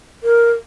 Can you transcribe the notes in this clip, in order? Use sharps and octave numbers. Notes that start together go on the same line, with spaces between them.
A#4